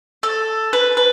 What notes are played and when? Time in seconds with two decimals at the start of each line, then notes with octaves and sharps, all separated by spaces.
0.23 A4
0.73 B4
0.97 B4